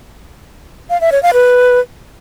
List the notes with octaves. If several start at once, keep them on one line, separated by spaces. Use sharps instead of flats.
F5
E5
C#5
F5
B4